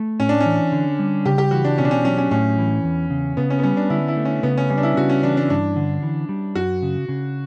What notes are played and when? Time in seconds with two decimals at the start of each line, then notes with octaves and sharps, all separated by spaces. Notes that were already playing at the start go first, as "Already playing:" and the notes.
Already playing: A3
0.20 A2 C#4
0.29 D4
0.40 C#4
0.46 E3
0.72 D3
0.99 G3
1.25 C#3 G4
1.38 G4
1.51 E3 F#4
1.65 D4
1.78 B2 C#4
1.85 D4
1.91 C#4
2.04 F#3 C#4
2.18 C#4
2.31 A2 C#4
2.58 E3
2.84 E2
3.10 C#3
3.37 C#3 B3
3.50 C#4
3.59 B3
3.63 G3 C#4
3.77 D4
3.90 D3 E4
4.08 E4
4.17 A3
4.25 C#4
4.43 C#3 B3
4.57 C#4
4.70 G3 C#4
4.78 D4
4.83 E4
4.97 C#3 F#4
5.09 C#4
5.23 E3 D4
5.37 D4
5.50 G2 D4
5.76 D3
6.03 E3
6.29 G3
6.55 F#2 F#4
6.83 C#3
7.09 C#3